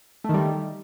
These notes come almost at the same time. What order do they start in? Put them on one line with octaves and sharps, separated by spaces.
A3 D#3 G3